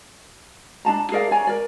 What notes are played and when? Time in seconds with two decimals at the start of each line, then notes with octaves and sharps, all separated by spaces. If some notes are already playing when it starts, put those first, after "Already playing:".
0.85 D4 D#4 A5 A#5
1.12 G#4 A#4 D5 F5
1.31 C#5 D5 G#5 A#5
1.47 A#4 D5